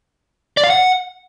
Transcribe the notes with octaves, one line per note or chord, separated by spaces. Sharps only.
D5
F5
F#5